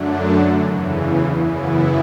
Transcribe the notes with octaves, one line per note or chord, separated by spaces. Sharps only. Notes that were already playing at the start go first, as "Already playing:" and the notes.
Already playing: F#2 D3 F#3 A3 D4
E2 C#3 E3
F#2 C#3 E3 B3 E4